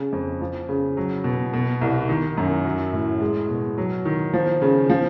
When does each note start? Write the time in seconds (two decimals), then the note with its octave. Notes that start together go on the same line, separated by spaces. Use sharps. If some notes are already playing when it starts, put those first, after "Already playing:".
Already playing: C#3
0.12 F2
0.41 F3
0.69 C#3
0.97 F#3
1.24 B2
1.53 B2
1.81 C2
2.09 D#3
2.38 F#2
2.65 F#3
2.93 A2
3.21 G#3
3.49 B2
3.78 F#3
4.05 D#3
4.34 F3
4.62 C#3
4.90 F3